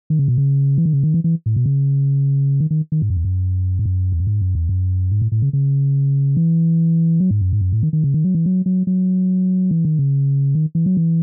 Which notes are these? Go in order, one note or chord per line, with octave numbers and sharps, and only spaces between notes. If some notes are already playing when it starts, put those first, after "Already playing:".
D#3
C#3
B2
C#3
E3
D#3
C#3
D#3
E3
E3
A2
B2
C#3
D#3
D#3
D#3
G#2
F#2
E2
F#2
G#2
F#2
E2
F#2
G#2
F#2
E2
F#2
G#2
A2
A2
C#3
C#3
E3
F#3
G#2
F#2
G#2
F#2
A2
D#3
D#3
C#3
D#3
F#3
E3
F#3
F#3
F#3
E3
D#3
C#3
D#3
E3
F#3
E3